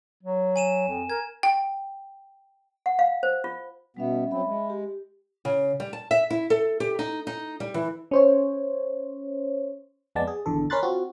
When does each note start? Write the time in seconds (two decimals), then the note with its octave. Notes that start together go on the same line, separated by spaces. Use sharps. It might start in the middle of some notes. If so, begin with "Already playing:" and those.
0.23 F#3
0.56 G#5 D#7 E7
0.89 F2
1.10 A#4 G#6
1.43 G5
2.86 F#5
2.99 F5
3.23 C5
3.44 F4
3.97 B2 G3 B3 C#4 E5
4.31 F#3 C4 E5 B5
4.45 G#3
4.70 G4
5.45 C#3
5.80 G3
5.93 A5
6.11 E5
6.30 E4
6.50 A4
6.80 G4
6.99 D#4
7.27 D#4
7.60 G3
7.74 E3
8.11 C#4 C5 C#5
10.15 F2 G#3 B3 D5 A5
10.27 G#4
10.46 G#1 E2 D3 A4
10.70 C#4 A#4 B5 C6 F#6 A6
10.83 C4 F4 F#4